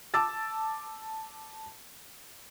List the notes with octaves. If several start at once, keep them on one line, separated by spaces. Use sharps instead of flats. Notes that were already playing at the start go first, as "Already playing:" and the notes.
A5 D6 E6 A6